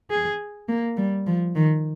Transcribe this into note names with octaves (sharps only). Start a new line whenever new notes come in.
G#4
A#3
G3
F3
D#3